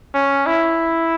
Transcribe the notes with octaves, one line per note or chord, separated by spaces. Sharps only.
C#4
E4